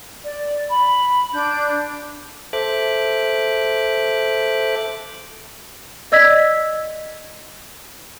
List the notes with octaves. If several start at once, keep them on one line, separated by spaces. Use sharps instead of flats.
D5
B5
D4 G6
A4 C5 E5 D6 F#6
D5 D#5 E6 G#6 B6